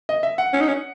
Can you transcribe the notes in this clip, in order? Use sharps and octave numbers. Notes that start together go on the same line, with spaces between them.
D#5
E5
F#5
C#4
D#4
C#4